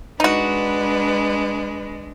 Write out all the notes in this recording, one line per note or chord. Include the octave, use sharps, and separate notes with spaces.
G#3 D4 D#4 F#4 B4